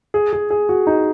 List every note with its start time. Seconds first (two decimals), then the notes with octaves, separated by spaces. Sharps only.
0.14 G#4
0.33 G#4
0.50 G#4
0.69 F#4
0.87 D#4